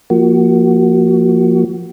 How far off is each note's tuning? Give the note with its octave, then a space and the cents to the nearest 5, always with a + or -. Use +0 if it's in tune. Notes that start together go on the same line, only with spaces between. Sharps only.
F3 +0 A#3 +0 F#4 +25